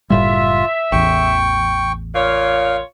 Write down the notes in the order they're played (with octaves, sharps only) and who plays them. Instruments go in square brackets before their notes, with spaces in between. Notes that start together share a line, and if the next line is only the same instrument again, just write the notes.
[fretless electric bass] F#1 A2 G3 [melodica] F4 [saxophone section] E5
[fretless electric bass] A1 E2 [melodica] G5 C#6
[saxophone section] A#2 F4 C#5 [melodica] F5